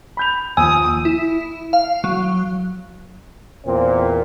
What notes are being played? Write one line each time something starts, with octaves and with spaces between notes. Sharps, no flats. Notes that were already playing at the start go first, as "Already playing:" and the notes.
B5 G6 F7
D#2 F3 G#5 D#6 E6
E4
F5
F#3
E2 A#2 C4